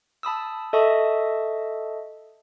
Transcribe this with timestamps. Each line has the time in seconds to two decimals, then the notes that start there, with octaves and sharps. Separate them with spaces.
0.23 A5 B5 D#6 E6
0.73 A4 D#5 E5 A5 C#6 D#6